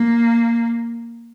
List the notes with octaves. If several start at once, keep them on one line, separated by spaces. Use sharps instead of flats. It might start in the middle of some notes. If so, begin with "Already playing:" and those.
Already playing: A#3